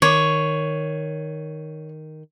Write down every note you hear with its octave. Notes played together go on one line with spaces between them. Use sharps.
D#3 C#5